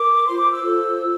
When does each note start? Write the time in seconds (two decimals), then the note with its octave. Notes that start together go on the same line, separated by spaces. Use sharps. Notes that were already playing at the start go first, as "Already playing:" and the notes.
Already playing: A#4 D6
0.26 F4 C5 C6
0.38 D6
0.51 E6
0.63 F4 A4 C5